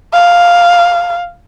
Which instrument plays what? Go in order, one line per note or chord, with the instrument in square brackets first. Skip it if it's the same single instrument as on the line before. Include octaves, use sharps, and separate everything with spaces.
[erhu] F5